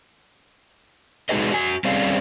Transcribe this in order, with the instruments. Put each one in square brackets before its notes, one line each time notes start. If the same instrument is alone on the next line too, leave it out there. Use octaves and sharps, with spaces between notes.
[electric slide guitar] G#3 D#4 F#4 G#4 B4 D#5
F#4 G#5
G3 C4 C#4 G#4 D5 F5